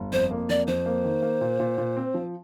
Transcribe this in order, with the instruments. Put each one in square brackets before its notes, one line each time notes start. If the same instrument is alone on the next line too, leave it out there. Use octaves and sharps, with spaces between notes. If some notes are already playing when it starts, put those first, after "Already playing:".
Already playing: [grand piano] G1
[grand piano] F2 [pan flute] C5
[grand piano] A#3
[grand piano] F2 [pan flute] D5
[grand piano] F2 [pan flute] C5
[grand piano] A#3
D#3
A#3
A#2
A#2
A#2
C4
F3